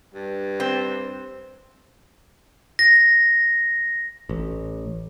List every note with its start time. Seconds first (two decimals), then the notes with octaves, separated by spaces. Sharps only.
0.14 G2
0.60 C4
2.79 A#6
4.29 A1